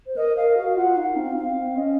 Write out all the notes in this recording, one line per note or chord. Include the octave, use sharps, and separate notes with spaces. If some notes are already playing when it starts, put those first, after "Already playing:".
C5
A#4 D#5
A#4 F5
F#4 F5
F4 F#5
D#4 F5
C4
C4 F5
C4
C#4 D#5